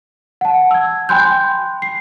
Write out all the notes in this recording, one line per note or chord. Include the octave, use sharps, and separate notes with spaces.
F#5 A5
E6 G#6
G5 G#5 B5 C6 F#6 G6
C7